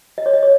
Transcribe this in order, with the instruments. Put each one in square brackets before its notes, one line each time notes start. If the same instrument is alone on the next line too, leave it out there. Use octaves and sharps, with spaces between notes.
[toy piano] D#5
C#5
D#5
C#5